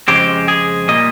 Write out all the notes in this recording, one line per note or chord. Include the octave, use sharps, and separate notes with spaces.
F2 C#3 G#3 C4 G4
G#4
A#2 G3 A#3 D#5